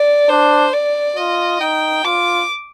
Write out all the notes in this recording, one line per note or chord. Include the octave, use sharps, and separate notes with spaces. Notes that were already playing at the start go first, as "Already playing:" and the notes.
Already playing: D5
D4 C5
D5
F4 D#5
D#4 G5
F4 D6